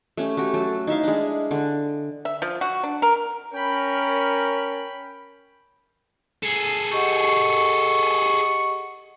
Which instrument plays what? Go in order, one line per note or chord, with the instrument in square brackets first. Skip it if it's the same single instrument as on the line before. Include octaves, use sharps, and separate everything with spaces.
[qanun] A3 C#4 G4
A3 F#4 G4
F#3 A4
D#4 E4 E5 F5
G#3 D4
D3
[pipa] E5
F3
F#4
D4
A#4
[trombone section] C#4 A#4 [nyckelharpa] G5 B5
[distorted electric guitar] G#4 A4
[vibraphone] G4 D#5 F#5 [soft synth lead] C#6